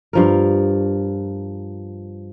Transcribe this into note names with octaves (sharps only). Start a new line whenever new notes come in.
G2 F3 A#4